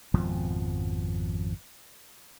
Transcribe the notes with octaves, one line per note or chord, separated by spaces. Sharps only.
G#1 F2 B2 F3